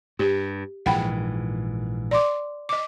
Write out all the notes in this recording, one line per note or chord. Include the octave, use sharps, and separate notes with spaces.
G2 G4
A#1 G#2 E3 F#5 G5 B5
D5 C6 D6
D#5 D6